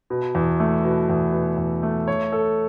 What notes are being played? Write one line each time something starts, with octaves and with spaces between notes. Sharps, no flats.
B2
E2
A3
B2
E2
B2
E2
A3
C#5
A4